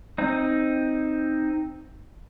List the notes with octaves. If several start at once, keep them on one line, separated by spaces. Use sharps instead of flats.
C4 D#4